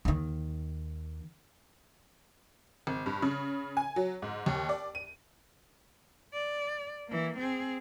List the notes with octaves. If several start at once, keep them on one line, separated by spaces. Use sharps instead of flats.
D#2 D#3
G#1
G2
C#3
G#5
F#3
G#2
D#2
D5
D#7
D5
E3 A#3
C4 G#4